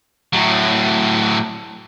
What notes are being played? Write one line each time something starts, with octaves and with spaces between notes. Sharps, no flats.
A2 F#3